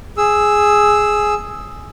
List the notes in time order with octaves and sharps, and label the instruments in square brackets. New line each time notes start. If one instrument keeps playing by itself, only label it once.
[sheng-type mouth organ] G#4 E6